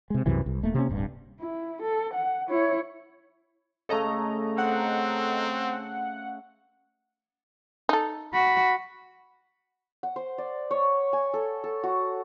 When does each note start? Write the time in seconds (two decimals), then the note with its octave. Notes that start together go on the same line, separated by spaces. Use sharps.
0.10 C3 G#3
0.26 C2 F#2 C3 E3
0.46 C2
0.62 D#1 A3 A#3
0.75 C3 A#3 C#4
0.89 D1 G2
1.40 E4
1.83 A4
2.14 F#5
2.49 E4 C#5
3.89 C#3 A3 A4 D#5 A#5
4.58 C4 F#5
7.89 D#4 A4
8.34 F#4 B5
10.03 F#5
10.16 C5
10.38 D5
10.71 C#5
11.13 G#5
11.34 A4
11.64 A4
11.83 F#4